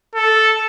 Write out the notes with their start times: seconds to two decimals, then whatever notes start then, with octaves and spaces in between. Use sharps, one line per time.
0.15 A4